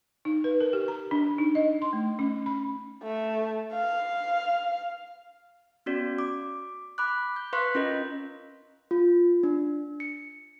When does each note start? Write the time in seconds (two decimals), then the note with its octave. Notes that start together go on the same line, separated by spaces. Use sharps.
0.25 D#4
0.44 B4
0.60 A#4
0.73 G4
0.88 A#5
1.11 D4
1.38 D#4
1.55 D#5
1.82 C6
1.93 A3
2.19 C#4
2.46 B5
3.03 A3
3.73 F5
5.86 B3 C#4 F#4 D5
6.19 D6
6.98 B5 D6 F#6
7.36 G6
7.53 B4 F5 C6 C#6 F#6 B6
7.75 C#4 F4 A#4 D#5
8.91 F4
9.43 D4
10.00 C#7